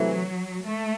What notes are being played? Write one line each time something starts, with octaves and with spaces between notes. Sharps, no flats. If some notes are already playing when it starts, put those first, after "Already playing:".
Already playing: C3 E3 F#3 A3
A3